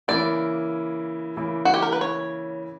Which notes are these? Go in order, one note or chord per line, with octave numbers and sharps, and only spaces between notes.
C#3 E3 A#3 E4 D5
C#3 E3 A#3 E4
F#4
G4
A#4
B4
C#5